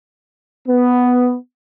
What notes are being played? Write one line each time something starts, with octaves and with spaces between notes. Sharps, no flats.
B3